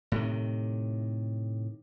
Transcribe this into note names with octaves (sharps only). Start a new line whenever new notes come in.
A2 C3 D#3